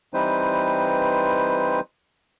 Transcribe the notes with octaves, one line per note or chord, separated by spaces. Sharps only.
E3 G3 C4 D#4 B4 C5